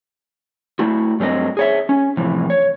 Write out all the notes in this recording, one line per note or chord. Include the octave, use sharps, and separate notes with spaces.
A3 E4 F#4
G2 F#3 A3 C4 D#5
G#4 C#5 E5
C#4
A2 C3 E3 F3
C#5